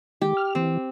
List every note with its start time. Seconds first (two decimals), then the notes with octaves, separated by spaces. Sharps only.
0.22 D#3 G#3 G4
0.37 F6
0.55 E3 C4